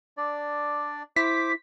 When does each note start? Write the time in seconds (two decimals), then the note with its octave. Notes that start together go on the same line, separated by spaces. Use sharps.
0.17 D4 D5
1.16 E4 C5 D6 B6